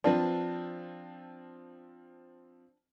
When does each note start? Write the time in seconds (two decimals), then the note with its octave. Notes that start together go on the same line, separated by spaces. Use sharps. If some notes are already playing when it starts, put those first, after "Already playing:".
0.04 F3 C4 D4 F4 B4